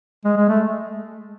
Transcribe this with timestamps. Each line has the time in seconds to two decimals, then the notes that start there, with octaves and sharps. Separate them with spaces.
0.25 G#3
0.37 G#3
0.48 A3